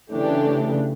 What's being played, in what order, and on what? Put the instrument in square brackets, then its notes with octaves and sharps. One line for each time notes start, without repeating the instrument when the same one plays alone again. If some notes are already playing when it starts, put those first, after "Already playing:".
[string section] C#3 E3 A3 D4 G4